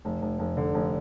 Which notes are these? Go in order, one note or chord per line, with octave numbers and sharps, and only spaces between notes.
F1
F1
F1
D3
F1